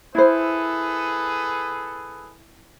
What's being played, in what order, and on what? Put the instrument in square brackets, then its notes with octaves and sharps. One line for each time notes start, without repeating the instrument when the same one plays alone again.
[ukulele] E4 C5 [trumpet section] G#4 A4 B4